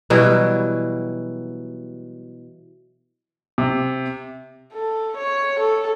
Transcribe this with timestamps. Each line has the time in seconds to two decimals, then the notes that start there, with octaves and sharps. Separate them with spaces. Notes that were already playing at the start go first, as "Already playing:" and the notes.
0.10 B2 E3 F#3 G3
3.58 C3
4.74 A4
5.18 C#5
5.60 A4